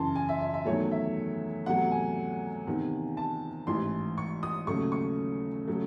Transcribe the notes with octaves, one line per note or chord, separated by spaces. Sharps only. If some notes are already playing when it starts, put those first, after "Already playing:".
Already playing: F#2 C#3 E3 A5 C6
G#5
E5
E5
E5
E2 D#3 F#3 A3 C#5
E5
E2 C3 F#3 A3 F#5
G#5
E2 C3 D#3
A5
A1 G#2 E3 C6
C#6
D#6
D#2 C#3 F#3 A3 C#6
C#6
C#3 F#3 A3